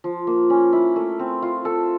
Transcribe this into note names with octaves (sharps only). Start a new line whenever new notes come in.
F3
A#3
C#4
E4
A3
C4
F4
A4